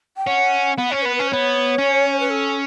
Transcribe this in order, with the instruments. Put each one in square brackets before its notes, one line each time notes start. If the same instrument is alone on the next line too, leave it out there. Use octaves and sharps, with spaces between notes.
[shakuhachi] G5
[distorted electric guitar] C#4 [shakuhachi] F#5
[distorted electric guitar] B3 [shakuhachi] F#5
[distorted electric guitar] C#4 [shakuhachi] C#5
[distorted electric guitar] B3 [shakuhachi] B4
[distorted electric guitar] C#4 [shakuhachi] B4
[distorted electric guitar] B3 [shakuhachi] C#5
[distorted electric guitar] C#4
[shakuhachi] B4
A4